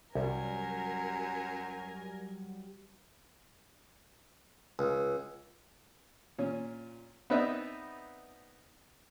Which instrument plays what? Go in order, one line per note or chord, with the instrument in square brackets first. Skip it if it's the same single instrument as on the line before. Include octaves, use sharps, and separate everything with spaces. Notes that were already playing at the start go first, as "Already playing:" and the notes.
[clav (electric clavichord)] C2 [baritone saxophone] F#2 [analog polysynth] F#3 G3 [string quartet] A#4 G#5
[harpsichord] C#2
[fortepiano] A#2 C#4
B3 C4 D#4 B4 D5 E5